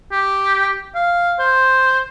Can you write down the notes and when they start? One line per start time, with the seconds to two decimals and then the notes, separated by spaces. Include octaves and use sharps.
0.12 G4
0.95 F5
1.39 C5